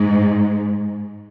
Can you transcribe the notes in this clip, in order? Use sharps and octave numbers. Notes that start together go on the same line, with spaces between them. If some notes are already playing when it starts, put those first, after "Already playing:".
Already playing: G#2